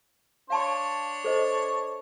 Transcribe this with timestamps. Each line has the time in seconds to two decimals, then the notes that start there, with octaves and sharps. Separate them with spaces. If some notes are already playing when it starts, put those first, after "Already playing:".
0.50 D4 C#5 F5 A5 C6
1.24 A4 C5 D#5